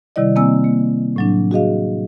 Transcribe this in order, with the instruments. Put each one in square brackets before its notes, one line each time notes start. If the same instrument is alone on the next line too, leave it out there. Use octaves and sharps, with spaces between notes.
[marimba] C3 D#3 G3 E4 D5 D#5
D#3 A#3 C4 G#5 E6
A#3
A2 F#3 D4
F#4 G#4 D#5 F5